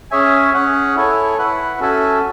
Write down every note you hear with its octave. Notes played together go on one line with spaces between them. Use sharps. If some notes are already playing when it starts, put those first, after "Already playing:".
C#4 G#4 C#5 E5 G#5
C#4 G#4 C#5 F#5
E4 A4 C#5 G#5
E4 B4 F#5
C#4 F#4 A4 E5 G#5